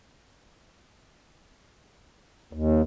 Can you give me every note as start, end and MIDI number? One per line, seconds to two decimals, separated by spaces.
2.53 2.82 39